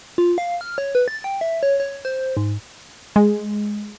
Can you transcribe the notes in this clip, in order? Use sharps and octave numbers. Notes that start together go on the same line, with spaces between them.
F4
F5
F6
C#5
B4
A6
G5
E5
C#5
C#5
C5
G#2
G#3